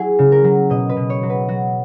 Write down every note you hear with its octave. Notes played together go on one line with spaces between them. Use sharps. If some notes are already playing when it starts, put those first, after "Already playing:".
Already playing: F#3 E4 F#4 G#4
C#3
A#4
F#3
B2 D#5
B4
B2
C#5
F#3
B4
F#3 F#4